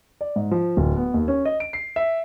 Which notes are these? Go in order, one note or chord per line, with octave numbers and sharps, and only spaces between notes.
D5
G#2
F3
D1
B3
D#2
C#4
D#5
D7
C7
E5